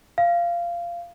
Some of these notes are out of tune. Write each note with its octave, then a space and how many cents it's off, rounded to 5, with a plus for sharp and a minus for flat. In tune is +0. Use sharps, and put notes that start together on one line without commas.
F5 -15